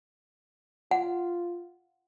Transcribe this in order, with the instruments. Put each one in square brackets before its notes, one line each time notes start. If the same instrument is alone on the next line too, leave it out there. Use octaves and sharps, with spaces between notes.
[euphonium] F4 [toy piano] F#5